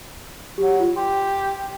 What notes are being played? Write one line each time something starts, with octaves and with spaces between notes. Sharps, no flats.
F#3 G4
F4
G4 C6